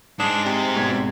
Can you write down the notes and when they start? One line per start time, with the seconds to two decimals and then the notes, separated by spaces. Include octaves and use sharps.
0.20 G#2 G#3 D4 D#6
0.45 C3
0.76 G#1 B2 G#6